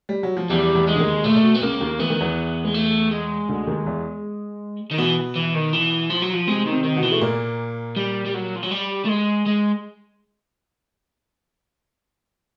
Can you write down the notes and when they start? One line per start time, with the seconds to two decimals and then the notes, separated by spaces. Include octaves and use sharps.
0.09 G3
0.23 F#3
0.37 F3
0.50 E2 E3 G3
0.75 E2 E3
0.87 G#3
0.95 D3
1.00 D#2 D#3
1.24 A#2 A3
1.35 A#2
1.43 B2
1.55 B3
1.62 C#2 C#3 A#3
1.81 D#2 D#3
1.99 E3 B3
2.10 D#3
2.20 E2 E3
2.65 G#3
2.74 A3
3.11 G#3
3.49 D2 D3
3.67 D#2 D#3
3.86 E2 E3
4.91 D#3
4.98 B2 E3 B3
5.36 E3
5.54 D#3
5.73 E3
6.10 F3
6.22 F#3
6.34 F3
6.47 C3 G#3 C4
6.66 D#3
6.72 C3 C4
6.84 D#3
6.97 B2 B3
7.03 E3
7.12 A3
7.21 A#2 A#3
7.97 G3
8.26 G3
8.34 F#3
8.55 F3
8.63 F#3
8.71 G3
9.05 A3
9.08 G#3
9.46 G#3